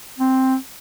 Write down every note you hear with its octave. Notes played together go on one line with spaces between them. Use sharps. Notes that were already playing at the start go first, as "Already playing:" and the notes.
C4